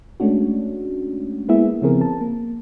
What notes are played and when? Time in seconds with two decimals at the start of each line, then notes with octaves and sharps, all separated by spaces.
0.20 G#3 A3 C#4 D4 F#4
1.48 G#3 A#3 B3 E4 G#4 E5
1.82 C#3 F3 B3 C4 G#4 A#4
2.01 A5
2.21 A#3